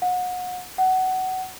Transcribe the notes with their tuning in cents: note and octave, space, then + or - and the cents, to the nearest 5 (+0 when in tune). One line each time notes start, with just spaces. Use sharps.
F#5 -30
F#5 +20